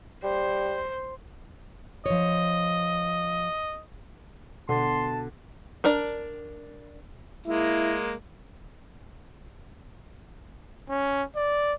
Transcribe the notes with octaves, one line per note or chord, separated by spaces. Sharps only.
G3 C5
F3 C#5 D#5
B2 D3 A5 C6
D4 A#4 D5
G#3 A#3 E4
C#4
D5